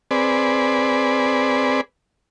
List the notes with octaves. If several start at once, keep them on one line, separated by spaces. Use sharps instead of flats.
C4 G#4 B4 D5